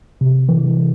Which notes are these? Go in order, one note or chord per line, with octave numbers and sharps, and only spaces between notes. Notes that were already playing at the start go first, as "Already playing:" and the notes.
C3
E3
E3